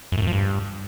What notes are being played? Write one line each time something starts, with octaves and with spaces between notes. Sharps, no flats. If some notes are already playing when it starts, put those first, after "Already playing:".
F#2
A2
F#2
F3
G2